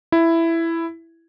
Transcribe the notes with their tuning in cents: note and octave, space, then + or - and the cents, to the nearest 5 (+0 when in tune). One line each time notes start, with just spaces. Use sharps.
E4 +10